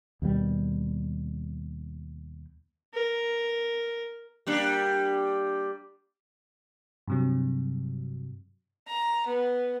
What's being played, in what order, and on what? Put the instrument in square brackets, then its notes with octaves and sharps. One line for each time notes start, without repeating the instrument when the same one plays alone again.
[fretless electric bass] D#2 B2 G3
[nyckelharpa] A#4
[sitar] G3 A#3 D4
[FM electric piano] G2 C3 F#3
[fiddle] A#5
B3